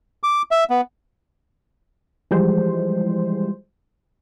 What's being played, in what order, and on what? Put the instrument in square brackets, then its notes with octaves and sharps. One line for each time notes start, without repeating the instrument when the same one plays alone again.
[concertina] D6
E5
B3
[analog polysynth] E3 F3 G3 G#3 C5